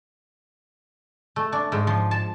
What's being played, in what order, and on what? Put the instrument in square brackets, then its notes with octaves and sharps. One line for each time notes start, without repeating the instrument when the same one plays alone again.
[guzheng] A3
D4
G#2
F3
A5